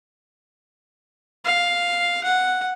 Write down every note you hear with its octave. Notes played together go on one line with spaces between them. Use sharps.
F5
F#5